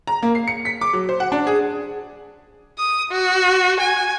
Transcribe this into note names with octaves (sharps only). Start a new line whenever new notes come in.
A#5
A#3
C7
C#7
B6
D6
F#3
C5
F#5
D4
G#4
D#6
F#4
G#5